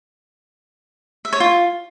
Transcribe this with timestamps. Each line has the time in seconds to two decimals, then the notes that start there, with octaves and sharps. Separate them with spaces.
1.25 E5
1.33 C#5
1.40 F4